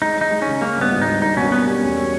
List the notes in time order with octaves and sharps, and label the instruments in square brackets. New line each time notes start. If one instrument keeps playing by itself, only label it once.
[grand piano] G#3 [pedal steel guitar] D#4
[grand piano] G#3
[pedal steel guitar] D#4
[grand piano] G#3
[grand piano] C#3 [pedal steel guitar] C#4
[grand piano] G#3 [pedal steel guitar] A#3
[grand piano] G2
[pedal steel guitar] B3
[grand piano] G#1
[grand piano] G2 [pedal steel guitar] D#4
[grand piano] A#3 [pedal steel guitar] D#4
[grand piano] B2 [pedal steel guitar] C#4
[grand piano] A#3 [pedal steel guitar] B3
[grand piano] G3 [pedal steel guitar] C#4
[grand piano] E1